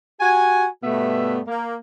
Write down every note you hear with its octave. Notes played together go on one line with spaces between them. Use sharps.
F#4 G4 G#5
G2 B2 A3 B3 E5
A#3